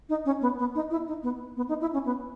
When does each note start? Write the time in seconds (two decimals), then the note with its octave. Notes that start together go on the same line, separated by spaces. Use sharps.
0.09 D#4
0.25 C#4
0.41 B3
0.58 B3
0.75 D#4
0.91 E4
1.07 D#4
1.23 B3
1.56 B3
1.69 D#4
1.81 E4
1.93 C#4
2.05 B3